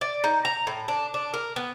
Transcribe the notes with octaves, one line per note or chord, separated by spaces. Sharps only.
D5
D#4
A#5
A2
D4
D4
A#4
B3